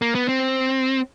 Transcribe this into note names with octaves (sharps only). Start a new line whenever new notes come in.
A#3
B3
C4